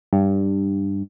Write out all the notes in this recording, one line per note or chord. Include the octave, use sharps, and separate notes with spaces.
G2